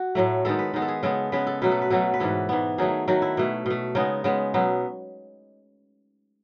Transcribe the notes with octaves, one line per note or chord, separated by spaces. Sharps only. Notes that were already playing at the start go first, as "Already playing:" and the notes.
Already playing: F#4
A2 F#3 A3
D#3 G#3 B3 A4
B4
D#3 G#3 B3
A4
G#4
C#3 G#3 B3 A4
C#3 G#3 B3 B4
A4
B2 F#3 A3 B4
A4
B4
B2 F#3 A3 A4
B4
G#2 E3 B3 A4
G#2 E3 B3
D#3 F#3 A3 G#4
D#3 F#3 A3 F#4
E4
B2 A3
B2 A3
C#3 G#3 B3 D#4
C#3 G#3 B3
B2 F#3 B3